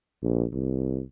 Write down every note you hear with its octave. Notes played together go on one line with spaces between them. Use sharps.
A#1
C2